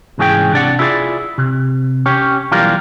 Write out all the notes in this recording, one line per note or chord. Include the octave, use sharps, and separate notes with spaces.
C2 G#2 E3 C#4 G#4 G5
C3 D4 D5 F#5
E4 F4 G#4 C5 D5
C3
C#4 G4 C#5
B1 E3 G3 F4 G4 A#4